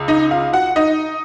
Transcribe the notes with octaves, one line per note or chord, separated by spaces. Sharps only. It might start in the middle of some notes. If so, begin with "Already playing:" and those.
Already playing: C#2
D#4 D#5
F4 F5
F#4 F#5
D#4 D#5